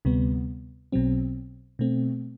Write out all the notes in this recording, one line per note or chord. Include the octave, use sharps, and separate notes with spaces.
D2 C3 G3 B3
B1 B2 F#3 C4
B2 A3 C4